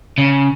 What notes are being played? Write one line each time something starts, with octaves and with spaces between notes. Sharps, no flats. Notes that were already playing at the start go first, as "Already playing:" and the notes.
C#3